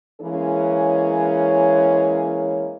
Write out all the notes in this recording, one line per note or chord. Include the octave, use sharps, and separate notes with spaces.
E3 G#3 A#3 C#4 G#4 C#5